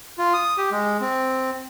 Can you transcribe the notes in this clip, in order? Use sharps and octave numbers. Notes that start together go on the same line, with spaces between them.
F4
D#6
G4
G#3
C4